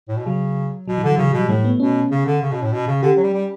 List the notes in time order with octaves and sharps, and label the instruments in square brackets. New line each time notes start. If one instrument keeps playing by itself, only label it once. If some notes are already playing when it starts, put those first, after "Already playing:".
[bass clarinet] A2
B2
[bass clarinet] C#3 [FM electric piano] F#3
[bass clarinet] B2 [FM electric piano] F#3
[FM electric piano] E3
[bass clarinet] D3 [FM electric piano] F#3
[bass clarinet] C#3 [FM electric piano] F#3
[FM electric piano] F#3
[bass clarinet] B2
[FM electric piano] G3
[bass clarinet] A2 [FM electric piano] A3
[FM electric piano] B3
[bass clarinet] B2 [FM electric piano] C#4
[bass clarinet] C#3
D3
C#3
B2
A2
B2
C#3
[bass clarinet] D3 [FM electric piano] G4
[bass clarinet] F#3
G3
G3